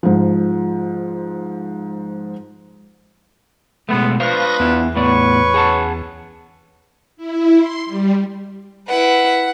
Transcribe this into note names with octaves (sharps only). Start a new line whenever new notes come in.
G#2 F3
B2 G#3 A3 B3
D4 F4 B4 C5 F5 C#6 D#6 A#6
E2 B3 E4
A2 B3 B4 C#5 D5 C#6
G#4 F#5 A5
E4
C6
G3
E4 B4 F#5